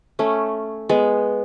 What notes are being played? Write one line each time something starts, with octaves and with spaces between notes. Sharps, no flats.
A3 C#4
G#3 B3